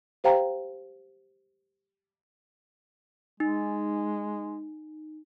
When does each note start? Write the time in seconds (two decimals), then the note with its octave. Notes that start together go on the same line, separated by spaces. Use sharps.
0.24 G4 C5 F5 G5 A#5
3.40 G#3 D#4